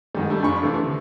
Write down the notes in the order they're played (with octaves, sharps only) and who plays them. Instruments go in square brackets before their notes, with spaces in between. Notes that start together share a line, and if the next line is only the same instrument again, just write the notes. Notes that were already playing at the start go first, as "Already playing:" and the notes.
[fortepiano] G#2 D#3 G3 [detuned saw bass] G#3
[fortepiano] G3 A3 [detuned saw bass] D4
[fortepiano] F2 B5 C#6
[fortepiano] C3 E3 A3 [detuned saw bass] D4
[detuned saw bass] D3